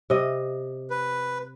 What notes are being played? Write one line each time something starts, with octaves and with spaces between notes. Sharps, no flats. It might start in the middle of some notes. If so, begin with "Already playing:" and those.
C3 D#5
B4